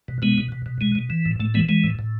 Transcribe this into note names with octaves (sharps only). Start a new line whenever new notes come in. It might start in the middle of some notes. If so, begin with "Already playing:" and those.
B2
B2 G#3 B3
B2
B2
B2
B2 G#3
B2
E3
A2
A2 A3
E3 G#3 B3
E3 G#3
A2
A2